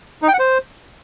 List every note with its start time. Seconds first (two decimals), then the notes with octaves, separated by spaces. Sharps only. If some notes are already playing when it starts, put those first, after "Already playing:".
0.22 D#4
0.28 G5
0.34 F#5
0.39 C5